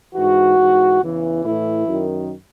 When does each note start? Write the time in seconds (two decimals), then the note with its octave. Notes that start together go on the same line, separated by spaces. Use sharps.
0.14 G#2 E3 F#4
0.57 G#2 E3
1.00 E2 C#3 E3
1.44 A2 E3 E4
1.87 F#2 D#3